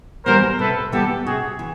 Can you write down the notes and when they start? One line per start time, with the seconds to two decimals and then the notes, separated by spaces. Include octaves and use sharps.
0.25 E3 G3 B3 A#4 C5
0.59 C3 A4 B4
0.92 E3 G3 B3 G4 A4
1.26 C3 F#4 G#4
1.59 E3